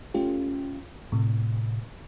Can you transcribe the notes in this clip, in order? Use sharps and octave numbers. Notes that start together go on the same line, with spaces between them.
A3 C#4 F4 G4
A2 C3